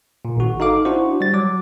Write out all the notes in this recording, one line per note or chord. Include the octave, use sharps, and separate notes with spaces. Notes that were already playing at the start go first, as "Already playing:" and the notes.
A#2
G#1 F#4
D#4 A4 F5 D6
D4 E4 F#4 C5
G3 A6
F#3 D6